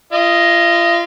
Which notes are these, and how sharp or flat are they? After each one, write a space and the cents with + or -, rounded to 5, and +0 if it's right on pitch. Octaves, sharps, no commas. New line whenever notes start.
F4 -35 D#5 +0